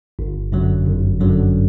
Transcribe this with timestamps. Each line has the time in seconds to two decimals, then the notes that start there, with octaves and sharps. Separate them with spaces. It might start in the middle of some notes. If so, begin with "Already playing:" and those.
0.19 G1
0.52 F#2 D3 F#3
0.87 G1
1.20 F#2 D3 F#3